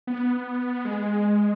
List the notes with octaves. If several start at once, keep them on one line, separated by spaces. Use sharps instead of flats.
B3
G#3